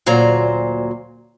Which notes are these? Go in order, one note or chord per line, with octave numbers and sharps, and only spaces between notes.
D2 A#2 F#3 C5 A#5